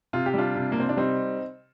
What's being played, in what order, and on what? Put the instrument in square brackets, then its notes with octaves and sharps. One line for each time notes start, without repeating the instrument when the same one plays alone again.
[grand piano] C3 F4
G4
G3 D4 F4
C3
A#3
C3 C4
D4
G3 C4 D#4